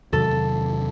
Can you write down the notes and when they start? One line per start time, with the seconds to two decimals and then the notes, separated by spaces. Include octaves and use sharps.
0.13 E2 C3 D#3 F#3 A4